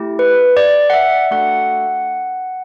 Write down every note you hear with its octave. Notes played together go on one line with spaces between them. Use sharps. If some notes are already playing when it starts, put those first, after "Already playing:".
Already playing: A3 E4 G4
B4
D5
F#5
E5
A3 D4 F#4 A4 F#5